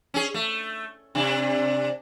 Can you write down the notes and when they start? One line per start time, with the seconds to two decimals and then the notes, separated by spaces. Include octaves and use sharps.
0.14 C#4 G#4
0.34 A3
1.15 C3 D4